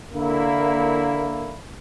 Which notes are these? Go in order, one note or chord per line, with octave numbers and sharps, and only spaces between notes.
D3 A#3 E4